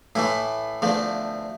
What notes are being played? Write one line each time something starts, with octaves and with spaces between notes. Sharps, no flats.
A2 E3 A3 E4
E2 D3 F3 A3